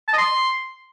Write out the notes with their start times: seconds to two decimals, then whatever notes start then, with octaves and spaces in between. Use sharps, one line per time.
0.08 A5
0.13 D#5
0.18 C6